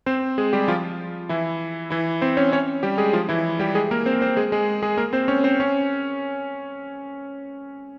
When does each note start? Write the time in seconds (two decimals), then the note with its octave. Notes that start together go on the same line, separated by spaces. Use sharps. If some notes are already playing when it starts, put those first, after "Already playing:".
0.06 C4 C5
0.38 G#3 G#4
0.53 G3 G4
0.68 F3 F4
1.29 E3 E4
1.90 E3 E4
2.21 C4 C5
2.37 C#4 C#5
2.52 C#4 C#5
2.83 G3 G4
2.98 G#3 G#4
3.13 F3 F4
3.29 E3 E4
3.59 G3 G4
3.75 G#3 G#4
3.91 A#3 A#4
4.06 C4 C5
4.22 C4 C5
4.37 G#3 G#4
4.52 G#3 G#4
4.83 G#3 G#4
4.97 A#3 A#4
5.13 C4 C5
5.28 C#4 C#5
5.44 C4 C5
5.60 C#4 C#5